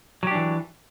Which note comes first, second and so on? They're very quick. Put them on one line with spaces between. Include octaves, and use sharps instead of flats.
F#3 G4 D4 E3